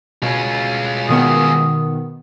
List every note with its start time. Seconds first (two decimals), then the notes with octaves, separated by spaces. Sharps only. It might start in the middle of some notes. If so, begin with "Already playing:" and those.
0.22 B2 G#3 F4
1.09 B2 D#3 B3 D#6